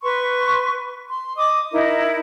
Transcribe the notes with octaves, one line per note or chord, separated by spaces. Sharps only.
B4 C6 C#6
C6
D#5 D6 D#6
D#4 E4 A#4